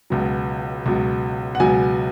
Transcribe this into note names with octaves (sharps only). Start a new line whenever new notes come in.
C#2 B2 F#3
C#2 B2 F#3
F#5
C#2 B2 F#3 G#5